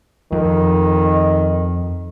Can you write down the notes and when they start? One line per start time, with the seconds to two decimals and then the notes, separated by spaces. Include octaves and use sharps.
0.32 F2 D#3